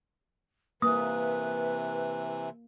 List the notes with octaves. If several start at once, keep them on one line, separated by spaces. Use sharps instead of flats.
C3 E3 A#3 B4 D#6